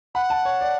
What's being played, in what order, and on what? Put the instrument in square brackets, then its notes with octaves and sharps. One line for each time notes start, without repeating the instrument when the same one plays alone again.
[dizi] F#5 [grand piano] B5
[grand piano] A5
C#5
D5